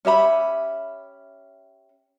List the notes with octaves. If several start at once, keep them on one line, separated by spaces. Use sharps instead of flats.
C#4 G4 E5 B5